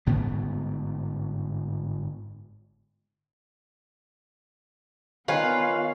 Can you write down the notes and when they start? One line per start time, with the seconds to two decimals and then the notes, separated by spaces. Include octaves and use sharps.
0.06 G1 G#2 B3
5.28 D#3 B3 F4 B4 C#5 F5 G#5